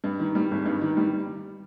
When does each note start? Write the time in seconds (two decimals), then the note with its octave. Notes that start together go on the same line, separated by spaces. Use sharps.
0.04 G2
0.20 D#3
0.35 G3
0.51 G#1
0.66 G2
0.81 D#3
0.97 G3